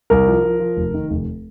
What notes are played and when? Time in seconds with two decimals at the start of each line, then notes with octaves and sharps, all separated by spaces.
0.10 C2 A#4
0.27 F3
0.43 F3
0.60 F3
0.77 F1
0.94 D#3
1.10 F1